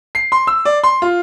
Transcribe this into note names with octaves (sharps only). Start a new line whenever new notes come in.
C7
C6
E6
D5
C6
F4